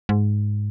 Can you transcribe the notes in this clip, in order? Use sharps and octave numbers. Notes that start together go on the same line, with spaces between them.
G#2